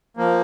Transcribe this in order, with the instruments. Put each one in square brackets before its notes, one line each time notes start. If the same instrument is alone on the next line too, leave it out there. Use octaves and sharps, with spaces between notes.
[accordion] F3 A#3